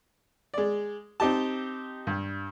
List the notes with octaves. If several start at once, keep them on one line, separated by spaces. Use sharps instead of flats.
G#3 D5
C4 D#4 G4 A5
G2